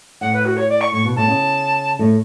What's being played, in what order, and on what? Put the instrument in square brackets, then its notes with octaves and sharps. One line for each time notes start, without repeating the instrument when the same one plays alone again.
[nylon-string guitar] A2 [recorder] F#5
[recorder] B4
F#4
C#5
D5
C#6
[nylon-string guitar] A2 [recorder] C#6
[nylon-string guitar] B2
[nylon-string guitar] A2 [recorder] A5
[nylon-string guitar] C#3
A2 A3